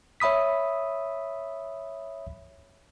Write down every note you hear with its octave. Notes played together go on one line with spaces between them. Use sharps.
C#5 E5 B5 D#6 B6